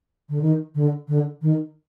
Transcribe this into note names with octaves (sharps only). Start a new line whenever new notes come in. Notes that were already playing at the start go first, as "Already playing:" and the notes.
D3
D#3
D3
D3
D#3